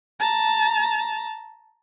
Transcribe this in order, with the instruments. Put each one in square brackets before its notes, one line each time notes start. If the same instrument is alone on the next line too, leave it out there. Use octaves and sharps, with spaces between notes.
[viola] A5 A#5